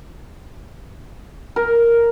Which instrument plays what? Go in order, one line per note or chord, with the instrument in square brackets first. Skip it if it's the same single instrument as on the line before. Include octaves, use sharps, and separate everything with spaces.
[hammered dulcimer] A#4